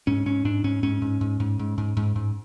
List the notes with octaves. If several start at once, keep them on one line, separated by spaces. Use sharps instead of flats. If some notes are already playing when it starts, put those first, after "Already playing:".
G#2 C#4
G#2 C#4
G#2 D4
G#2 C#4
G#2 C#4
G#2
G#2
G#2
G#2
G#2
G#2
G#2